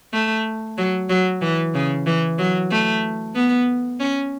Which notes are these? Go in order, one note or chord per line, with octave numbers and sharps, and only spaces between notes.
A3
F#3
F#3
E3
C#3
E3
F#3
A3
B3
C#4